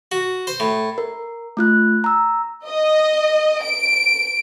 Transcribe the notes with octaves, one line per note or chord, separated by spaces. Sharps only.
F#4
C5
A2
A#4
A3 F4 F#6
A#5 E6
D#5
D7